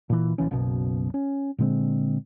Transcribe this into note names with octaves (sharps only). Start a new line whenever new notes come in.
A#2 E3
A#1 F2 E3 C#4
F#1 B1 F#2 B2
C#4
A#2 D3 G#3 C4